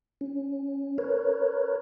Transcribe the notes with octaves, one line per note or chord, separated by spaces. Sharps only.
C#4
A#4 B4 C#5